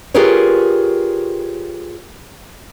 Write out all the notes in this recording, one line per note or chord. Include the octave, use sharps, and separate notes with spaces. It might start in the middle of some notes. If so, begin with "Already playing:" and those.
F4 G4 G#4 A#4 B4 C#5